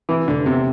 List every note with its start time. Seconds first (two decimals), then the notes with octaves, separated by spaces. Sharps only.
0.09 C3 E3
0.28 F1 D3
0.46 E2 C3